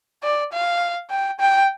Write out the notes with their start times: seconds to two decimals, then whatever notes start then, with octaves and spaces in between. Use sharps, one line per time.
0.23 D5
0.53 F5
1.10 G5
1.40 G5